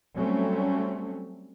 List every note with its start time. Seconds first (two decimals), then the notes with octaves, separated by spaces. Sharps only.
0.15 F#3 G3 A3 C4 C#4